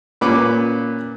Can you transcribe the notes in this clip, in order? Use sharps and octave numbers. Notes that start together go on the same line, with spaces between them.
A#2 C#4 B4 D6